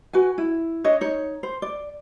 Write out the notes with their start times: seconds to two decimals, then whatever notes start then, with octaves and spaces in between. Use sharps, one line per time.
0.13 F#4 B4 G#5
0.38 E4
0.84 D4 C#5 D#5
1.01 D#4 C#5
1.43 C5
1.62 D5